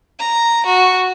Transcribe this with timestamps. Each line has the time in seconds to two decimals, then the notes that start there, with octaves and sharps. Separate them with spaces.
0.19 A#5
0.66 F#4